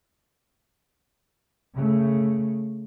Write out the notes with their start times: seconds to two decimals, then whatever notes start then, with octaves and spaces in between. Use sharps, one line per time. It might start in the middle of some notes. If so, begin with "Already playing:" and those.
1.75 C#3 A3